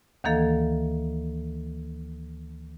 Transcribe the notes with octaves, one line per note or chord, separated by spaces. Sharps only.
D2 D#3 E3 A#3 A4 F5